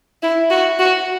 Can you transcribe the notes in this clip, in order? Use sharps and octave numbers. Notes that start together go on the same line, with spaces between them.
E4
F#4
F#4